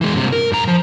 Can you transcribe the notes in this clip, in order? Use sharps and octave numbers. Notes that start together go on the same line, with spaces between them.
E3 G#3
G2 C3
A#4
G2 A#5
F3